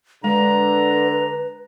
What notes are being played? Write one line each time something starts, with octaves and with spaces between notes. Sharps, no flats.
D3 G#3 B4 A#5